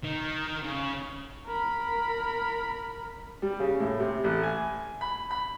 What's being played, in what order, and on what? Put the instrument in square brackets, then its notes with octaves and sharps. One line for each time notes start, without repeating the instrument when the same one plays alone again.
[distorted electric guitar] D#3
C#3
[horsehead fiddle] A#4 B5
[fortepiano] G3
C#3
A2
C3
A1
G#5
B5
B5